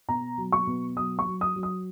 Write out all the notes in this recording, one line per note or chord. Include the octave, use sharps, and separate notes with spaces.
B2 A#5
F#3
C#6
B2
F#3 D#6
C#6
F#3
D#6
F#3
D#6